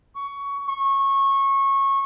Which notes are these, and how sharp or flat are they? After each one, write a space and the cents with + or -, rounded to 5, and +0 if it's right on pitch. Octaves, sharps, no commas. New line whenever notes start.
C#6 +15
C#6 -20